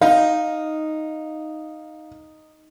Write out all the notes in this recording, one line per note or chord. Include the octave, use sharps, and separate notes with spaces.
D#4 F5